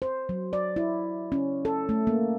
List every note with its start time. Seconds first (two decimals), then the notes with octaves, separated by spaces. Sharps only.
0.02 C5
0.29 F#3
0.53 D5
0.76 E4
1.32 C#4
1.65 A4
1.89 A3
2.07 A#3